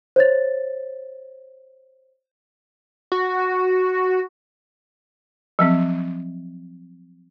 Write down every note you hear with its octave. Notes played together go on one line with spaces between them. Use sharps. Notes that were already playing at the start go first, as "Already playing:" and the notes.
C5 C#5 A6
F#4
F3 F#3 C4